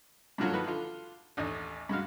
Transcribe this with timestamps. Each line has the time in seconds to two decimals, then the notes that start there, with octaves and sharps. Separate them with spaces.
0.38 G2 D3 F3 F#3 F4 F#4
0.53 D#3 F3 F#4 B4
0.67 D3 F4
1.37 A1 D#2 D4 D#5
1.89 G2 G#3 F#4 F5